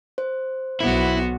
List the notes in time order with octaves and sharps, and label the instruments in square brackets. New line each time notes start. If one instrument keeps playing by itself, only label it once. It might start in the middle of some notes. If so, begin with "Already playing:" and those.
[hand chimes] C5
[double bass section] B1 [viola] B3 F#4 [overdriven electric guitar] E4